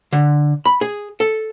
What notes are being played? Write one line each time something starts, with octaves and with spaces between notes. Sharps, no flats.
D3
B5
G#4
A4